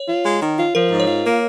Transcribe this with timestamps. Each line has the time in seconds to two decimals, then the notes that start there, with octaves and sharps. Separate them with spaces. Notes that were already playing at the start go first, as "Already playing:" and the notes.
Already playing: C#5
0.09 F4
0.25 G#3
0.42 D#3
0.58 F4
0.75 F3 A#4
0.91 G#2
1.00 C#5
1.08 F4
1.24 A#3